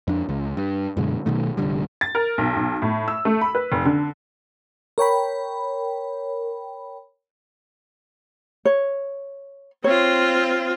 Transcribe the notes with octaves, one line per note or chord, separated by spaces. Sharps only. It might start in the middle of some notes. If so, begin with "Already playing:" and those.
F2 D4
C#2
G2
F#2 B2 D3 G#3
B1 B2 D#3 A3
F1 A#1 D3 G3
A6
A#4
B1
B1
A2
E6
A3
B5
B4
F1
D3
A#4 C#5 G5 B5
C#5
C4 F4 C#5